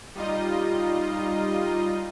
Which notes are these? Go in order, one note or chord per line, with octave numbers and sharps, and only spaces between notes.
G3 D#4 F4 D#5